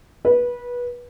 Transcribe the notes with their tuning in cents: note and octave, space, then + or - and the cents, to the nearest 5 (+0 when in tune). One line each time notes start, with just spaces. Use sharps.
B4 -20